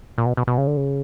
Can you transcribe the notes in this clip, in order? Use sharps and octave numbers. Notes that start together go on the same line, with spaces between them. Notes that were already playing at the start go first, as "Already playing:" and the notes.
A#2
B2
B2
B2
C#3
D3
C#3